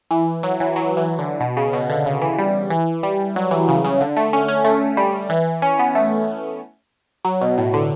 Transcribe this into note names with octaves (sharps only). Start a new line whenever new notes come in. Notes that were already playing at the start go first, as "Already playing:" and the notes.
E3
F#3
E3
F#3
E3
D3
B2
C#3
B2
D3
C#3
E3
G3
E3
G3
F#3
E3
C#3
C#3
D3
A3
C#4
C#4
A3
G3
E3
C#4
B3
A3
F#3
B2
A2
D3